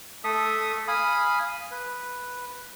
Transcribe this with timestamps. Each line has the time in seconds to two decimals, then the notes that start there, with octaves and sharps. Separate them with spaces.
0.24 A3 A4 E5 D#6
0.88 F5 G#5 B5 D#6
1.71 B4